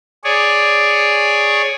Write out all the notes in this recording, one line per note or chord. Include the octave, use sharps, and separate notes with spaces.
G#4 C#5 D5